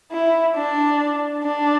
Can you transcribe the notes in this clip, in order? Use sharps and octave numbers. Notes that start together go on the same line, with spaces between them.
E4
D4
D4